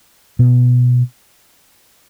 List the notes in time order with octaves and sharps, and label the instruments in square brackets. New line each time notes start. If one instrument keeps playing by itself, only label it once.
[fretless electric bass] B2 B3